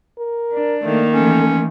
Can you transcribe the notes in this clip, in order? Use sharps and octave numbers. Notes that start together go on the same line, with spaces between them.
A#4
D4
D#3 A3 A#3
E3 A3 C#4 A4